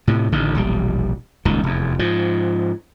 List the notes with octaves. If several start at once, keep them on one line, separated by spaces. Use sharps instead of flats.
A2 C3
A1 D3 D#3
E1 A#1 G3
D#1 C#2 D#3
F1 E2
G#2 F3